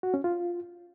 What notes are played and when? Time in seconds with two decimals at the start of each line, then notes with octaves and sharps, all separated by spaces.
0.03 F#4
0.14 C#4
0.24 F4